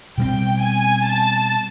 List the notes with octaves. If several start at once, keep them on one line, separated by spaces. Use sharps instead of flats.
B2 G3 C4 G5
G#5
A5